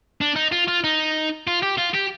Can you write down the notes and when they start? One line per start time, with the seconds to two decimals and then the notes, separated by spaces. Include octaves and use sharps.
0.21 D4
0.36 D#4
0.52 F4
0.68 F4
0.84 D#4
1.48 F4
1.63 G4
1.78 F4
1.95 G4